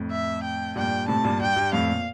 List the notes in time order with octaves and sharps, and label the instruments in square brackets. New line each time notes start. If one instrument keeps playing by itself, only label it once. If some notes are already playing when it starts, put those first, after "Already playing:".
Already playing: [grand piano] F2 A2
[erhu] E5
G5
[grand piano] G2 A#2 [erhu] G5
[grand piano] A2 C3 [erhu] A5
[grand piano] G2 A#2
[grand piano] G2 [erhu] G5
[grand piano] G2
[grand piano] F2 A2 [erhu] F5
[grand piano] A#2